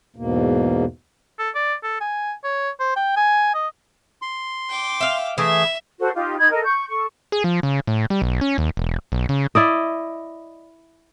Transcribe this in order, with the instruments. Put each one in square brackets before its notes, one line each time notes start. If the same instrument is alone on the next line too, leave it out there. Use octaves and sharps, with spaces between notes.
[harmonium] E2 G#2 B2 A#3
[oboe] A4
D5
A4
G#5
C#5
C5
G5
G#5
D#5
[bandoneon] C6
[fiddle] G5 D6
[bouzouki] E5 F5
[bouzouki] E3 [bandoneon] A3 G#4 [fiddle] E5
[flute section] F#4 A4 C5
D#4 F4 G4
D#4 B5 G#6
A4 A#4 D#5
C#6 G6
A4 C#6
[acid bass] G#4
F3
C#3
A2
G3
B1
C#4
D#2
E1
B1
C#3
[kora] E4 D5 D#5